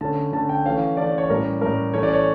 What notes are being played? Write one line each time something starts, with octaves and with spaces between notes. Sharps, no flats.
D3 A3 C#4 A5
D3 A3 C#4 A5
G5
E3 A3 C#4 F5
E3 A3 C#4 D5
C#5
A2 G3 C#4 A#4
A2 G3 C#4 A#4
E3 A3 C#4 C#5
D5
C#5